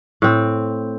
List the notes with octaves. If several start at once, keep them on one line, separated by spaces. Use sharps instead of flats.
A2 C4